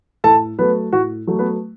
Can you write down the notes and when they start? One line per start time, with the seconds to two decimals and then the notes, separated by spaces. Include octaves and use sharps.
0.24 A2 A4 A5
0.59 F#3 A3 B3 B4
0.93 A2 F#4
1.27 F#3 A3
1.39 B3 B4